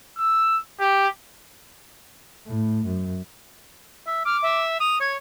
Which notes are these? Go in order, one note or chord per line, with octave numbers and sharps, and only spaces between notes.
E6
G4
A2
F#2
E5
D6 F6
E5
D#6 F7
C#5 G#6